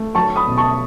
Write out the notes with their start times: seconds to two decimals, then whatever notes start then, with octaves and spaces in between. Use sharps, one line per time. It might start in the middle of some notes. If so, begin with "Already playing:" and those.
Already playing: A3
0.15 F#3 A5 C#6
0.36 B5 D#6
0.47 B2
0.58 A5 C#6